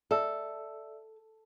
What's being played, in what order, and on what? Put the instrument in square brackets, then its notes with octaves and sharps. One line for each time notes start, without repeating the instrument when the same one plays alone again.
[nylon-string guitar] A4 [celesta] D5 E5 E6